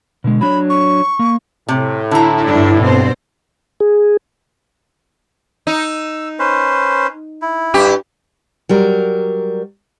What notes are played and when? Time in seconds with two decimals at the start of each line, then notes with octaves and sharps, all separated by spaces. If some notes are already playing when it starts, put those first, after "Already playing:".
0.24 B2 D3 G#3
0.41 F#3 D4 C#5 B5
0.70 C#6
1.19 A#3
1.68 A2 C3
2.11 D3 E4 A#5
2.44 G2 D4
2.80 G2 B2 C4 C5
3.80 G#4
5.67 D#4 E6
6.39 C#4 B4 C5
7.42 E4
7.74 G2 G4
8.69 F#3 G3 A#4